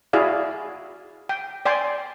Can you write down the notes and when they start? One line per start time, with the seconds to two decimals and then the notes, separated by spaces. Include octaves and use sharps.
0.13 E4 F#4 G#4 D5 F5
1.29 G5
1.66 D5 G5 G#5 C6